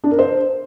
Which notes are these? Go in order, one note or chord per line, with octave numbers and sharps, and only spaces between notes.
D4
A#4
C5